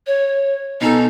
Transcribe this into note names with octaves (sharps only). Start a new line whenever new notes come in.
C#5
B2 C#4 D#4 A4